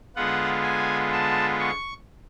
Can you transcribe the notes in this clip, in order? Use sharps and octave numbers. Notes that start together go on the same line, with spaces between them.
D3 G#3 B3 F4 F#5
G#5
A5
C#6